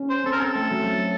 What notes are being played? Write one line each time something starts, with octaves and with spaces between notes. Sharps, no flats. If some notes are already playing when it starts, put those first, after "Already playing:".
Already playing: C#4
C5
C4 A4
A#4
C4 A4
A3
F#3
F#3